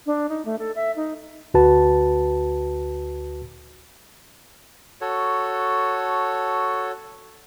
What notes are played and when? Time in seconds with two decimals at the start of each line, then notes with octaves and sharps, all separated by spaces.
0.06 D4
0.29 D#4
0.45 A3
0.59 A4
0.76 E5
0.96 D#4
1.54 D2 F#4 B4 A5
5.01 F#4 A4 C#5